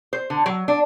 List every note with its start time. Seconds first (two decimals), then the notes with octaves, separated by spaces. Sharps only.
0.13 C5
0.30 D3
0.46 F#3
0.68 D4